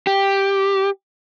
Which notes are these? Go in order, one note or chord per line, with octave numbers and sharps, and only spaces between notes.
G4